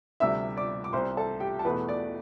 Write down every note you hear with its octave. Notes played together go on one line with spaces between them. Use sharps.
D2 C3 G3 E5 E6
D5 D6
D6
C2 C3 G3 C5 C6
A4 A5
G4 G5
A5
E2 B2 A3 B4 B5
D5 D6